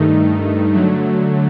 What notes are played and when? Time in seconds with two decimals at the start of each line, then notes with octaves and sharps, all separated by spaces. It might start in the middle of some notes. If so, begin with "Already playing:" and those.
Already playing: G2 D#3 A3 D#4
0.72 D3 F#3 A3